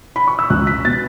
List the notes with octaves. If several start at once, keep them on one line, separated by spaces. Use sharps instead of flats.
B5
C#6
E6
C#2 F#6
B6
B2 A6